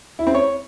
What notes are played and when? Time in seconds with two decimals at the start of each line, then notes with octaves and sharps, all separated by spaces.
0.19 E4
0.27 C4
0.34 C#5